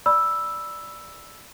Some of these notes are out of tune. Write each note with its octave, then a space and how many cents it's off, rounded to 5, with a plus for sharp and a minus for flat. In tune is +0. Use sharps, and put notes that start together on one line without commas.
D5 +0 B5 -10 E6 +0